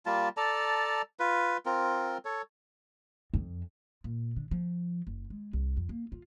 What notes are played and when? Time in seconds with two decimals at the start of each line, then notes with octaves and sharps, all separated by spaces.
0.06 G3 A#3 F4 A5
0.37 A4 D5 A5 A#5
1.19 F4 B4
1.66 C4 F4 A#4
2.25 A4 C#5
3.34 F2
4.04 A#2
4.37 D3
4.51 F3
5.07 F#1
5.30 G#3
5.53 C2
5.77 F2
5.89 A#3
6.12 F4